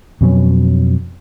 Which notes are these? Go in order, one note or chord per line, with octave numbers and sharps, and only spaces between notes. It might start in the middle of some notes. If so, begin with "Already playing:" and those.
F2 B2 F#3 C#4